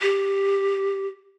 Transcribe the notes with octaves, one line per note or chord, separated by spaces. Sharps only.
G4